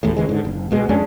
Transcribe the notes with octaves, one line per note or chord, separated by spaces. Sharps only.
E1 A1 E2 A2
G#1 C#3 E3 G#3
G#2 D3
F#1
C#2 B2 G#3
F2 G#3 C#4 D4